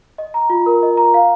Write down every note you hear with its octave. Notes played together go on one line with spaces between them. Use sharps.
D#5
A#5
F4
A#4
D#5
A#5
F5